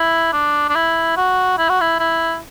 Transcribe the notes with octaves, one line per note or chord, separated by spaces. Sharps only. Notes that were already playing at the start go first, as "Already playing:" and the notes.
Already playing: E4
D4
D4
E4
F#4
E4
F#4
E4
E4